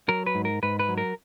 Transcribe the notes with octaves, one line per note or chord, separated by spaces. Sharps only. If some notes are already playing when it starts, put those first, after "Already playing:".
F#3 A#4
B4
G#2
A#4
G#2 B4
B4
F#3
A#4